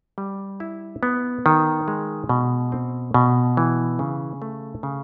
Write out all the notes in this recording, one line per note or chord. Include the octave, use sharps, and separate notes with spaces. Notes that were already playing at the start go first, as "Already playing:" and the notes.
G3
E4
B3
D#3
G#3
B2
C4
B2
E3
C#3
A3
C#3